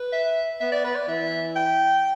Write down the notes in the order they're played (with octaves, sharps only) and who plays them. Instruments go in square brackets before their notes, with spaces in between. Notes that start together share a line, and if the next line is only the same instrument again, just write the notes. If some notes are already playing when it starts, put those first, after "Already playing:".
Already playing: [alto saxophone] B4
[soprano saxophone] E5
[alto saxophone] B3 [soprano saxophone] E5
[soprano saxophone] D5
B4
D5
[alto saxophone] E3 [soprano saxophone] E5
[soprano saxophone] G5